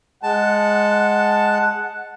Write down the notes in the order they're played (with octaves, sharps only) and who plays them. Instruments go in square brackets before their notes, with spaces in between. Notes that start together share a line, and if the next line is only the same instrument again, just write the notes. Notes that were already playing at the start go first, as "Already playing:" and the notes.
[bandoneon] G#3 A5 [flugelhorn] F#5